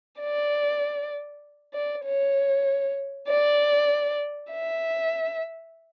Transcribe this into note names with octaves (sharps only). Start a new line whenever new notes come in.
D5
D5
C#5
D5
E5